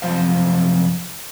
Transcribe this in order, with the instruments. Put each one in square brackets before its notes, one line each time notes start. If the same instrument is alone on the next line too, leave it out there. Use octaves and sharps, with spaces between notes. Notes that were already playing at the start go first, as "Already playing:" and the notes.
[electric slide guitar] F#2 C3 F3 C5 F5